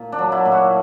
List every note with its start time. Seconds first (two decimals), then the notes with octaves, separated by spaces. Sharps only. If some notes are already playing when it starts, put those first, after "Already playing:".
Already playing: A#2
0.12 D4
0.19 F#3
0.32 E4
0.45 A#2
0.52 F#4